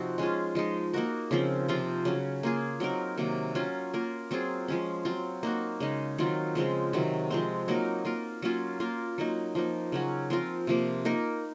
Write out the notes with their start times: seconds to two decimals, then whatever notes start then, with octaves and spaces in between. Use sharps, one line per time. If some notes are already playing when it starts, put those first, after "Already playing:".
Already playing: C3 F3 C4 D#4 F#4
0.18 G#3 C#4 F4 G#4
0.55 F3 G#3 D#4
0.93 A#3 D#4 F#4 A#4
1.31 C#3 F3 C4
1.68 C3 F3 C4 F4
2.05 C#3 F#3 C#4
2.43 A#3 F4 G#4
2.80 F#3 C4 D#4 A#4
3.17 C3 D#3 F#3 A#3
3.55 F#3 C#4 F4
3.94 A#3 F4 A#4
4.31 F#3 C4 F4 G#4
4.68 F3 G#3 C#4
5.05 F#3 C4 F4
5.43 A#3 D#4 F#4
5.80 C#3 G#3 D#4
6.18 D#3 F#3 C4 F4
6.55 C#3 F3 G#3 C4
6.93 C3 D#3 F#3
7.30 F3 G#3 C4
7.68 F#3 A#3 D#4 A#4
8.05 A#3 F4 A#4
8.42 F#3 A#3 C#4 F4
8.80 A#3 F4 A#4
9.18 F#3 A#3 D#4
9.55 F3 A#3 D#4
9.92 C#3 F#3 C#4 F#4
10.30 F3 C4 F4 A#4
10.67 C3 F3 A#3
11.05 A#3 D#4 A#4